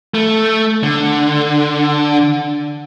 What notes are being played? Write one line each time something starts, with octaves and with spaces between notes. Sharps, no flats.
A3
D3